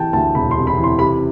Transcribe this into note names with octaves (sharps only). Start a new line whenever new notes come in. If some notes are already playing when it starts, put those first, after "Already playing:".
Already playing: C3 E3 G5 A5
D2 A5
E1 B5
C6
C3
B5
E3
C6
C3 B5